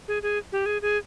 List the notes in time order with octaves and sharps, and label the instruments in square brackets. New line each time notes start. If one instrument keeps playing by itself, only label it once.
[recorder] G#4
G#4
G4
G#4
G#4